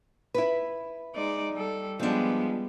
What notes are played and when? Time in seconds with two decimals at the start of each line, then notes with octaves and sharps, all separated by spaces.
0.34 E4 B4
1.15 G#3 D#4 D5
1.52 G3 A4
1.99 F3 G3 G#3 B3 D4